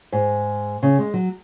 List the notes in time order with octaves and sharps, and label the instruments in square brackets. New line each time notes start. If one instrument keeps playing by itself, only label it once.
[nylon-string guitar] G#2
C#3
G#3
F#3